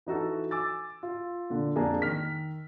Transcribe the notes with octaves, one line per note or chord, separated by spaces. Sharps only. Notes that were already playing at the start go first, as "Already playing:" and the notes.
E3 D#4 F#4 A4
G#5 D6 E6 A6
F4
A#2 D3
F2 A#3 D4 G#4 A#4 A5
D#3 F6 B6